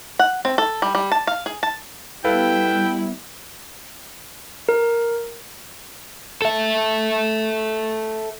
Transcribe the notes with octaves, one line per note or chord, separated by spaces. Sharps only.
F#5
C4
A4
G3
G3
A5
F5
G#4
A5
G3 B3 E4 A4 B4 F5 G5
A#4
A4 E5